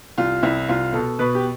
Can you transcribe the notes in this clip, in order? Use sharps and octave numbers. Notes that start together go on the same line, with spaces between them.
C2 F4
C2 E4
C2 F4
B2 A4
B2 B4
G4